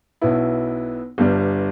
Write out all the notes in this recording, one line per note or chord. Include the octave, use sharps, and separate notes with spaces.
B1 B2 B3 E4
G1 G2 G3 D4